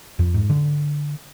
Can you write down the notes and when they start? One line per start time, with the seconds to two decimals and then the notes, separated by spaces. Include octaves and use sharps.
0.19 F2
0.34 G#2
0.50 D3